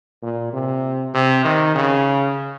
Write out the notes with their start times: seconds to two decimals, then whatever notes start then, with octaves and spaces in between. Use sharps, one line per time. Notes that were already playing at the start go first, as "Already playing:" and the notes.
0.23 A#2
0.53 C3
1.15 C3
1.45 D#3
1.75 C#3